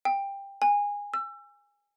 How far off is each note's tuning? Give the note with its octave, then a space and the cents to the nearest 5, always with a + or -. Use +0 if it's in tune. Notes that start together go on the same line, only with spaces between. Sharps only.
G5 +15
G#5 -20
E6 +30